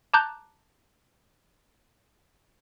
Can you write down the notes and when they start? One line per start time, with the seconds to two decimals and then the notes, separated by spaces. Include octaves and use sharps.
0.14 A5 A#5 D6 F#6 G6